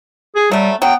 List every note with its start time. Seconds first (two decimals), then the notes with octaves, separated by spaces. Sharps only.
0.36 G#4
0.51 F#3 G3 A3
0.82 F#3 B3 G5